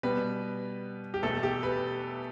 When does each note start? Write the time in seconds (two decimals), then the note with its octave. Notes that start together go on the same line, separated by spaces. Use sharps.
0.03 B2 G3 B3 B4
1.14 G4
1.23 E2 B2 A3 A4
1.43 G4
1.63 B4